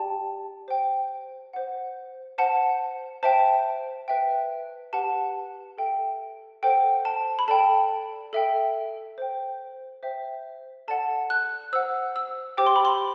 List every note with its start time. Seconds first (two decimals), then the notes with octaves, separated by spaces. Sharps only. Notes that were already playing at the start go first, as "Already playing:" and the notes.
Already playing: G4 D5 G5 A5
0.68 C5 G5
1.53 C5 F#5
2.38 C5 F#5 A5
3.23 C5 E5 G5 A5
4.08 B4 E5 G5
4.93 G4 B4 F#5 A5
5.78 A4 E5 G5
6.63 A4 C5 F#5 G5
7.05 A5
7.39 B5
7.48 A4 D5 G5 A5
8.33 A4 E5 G5
9.18 C5 G5
10.03 C5 E5 G5
10.88 A4 D5 F#5 A5
11.30 F#6
11.73 C5 F#5 E6
12.16 E6
12.57 G4 C5 G5 D6
12.66 C6
12.76 B5
12.85 C6